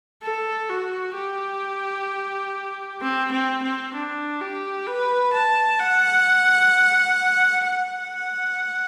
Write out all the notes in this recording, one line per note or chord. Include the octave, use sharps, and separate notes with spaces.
A4
F#4
G4
C4
C4
C4
D4
G4
B4
A5
F#5
F#5